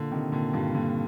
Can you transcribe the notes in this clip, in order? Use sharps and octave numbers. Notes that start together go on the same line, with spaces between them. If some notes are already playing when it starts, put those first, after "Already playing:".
Already playing: A#2 D3
C3 D#3
A#2 D3
G2 A#2
A#2 D3